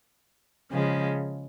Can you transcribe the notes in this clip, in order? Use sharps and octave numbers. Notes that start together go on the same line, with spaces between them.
C#3 F3 G#3